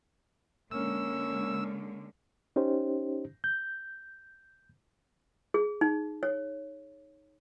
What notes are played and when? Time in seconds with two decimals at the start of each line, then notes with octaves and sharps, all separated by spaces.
0.71 D3 G#3 A#3 C#4 E6
2.56 C#4 D#4 G4 C5
3.44 G6
5.54 G#4
5.81 D#4
6.23 C#5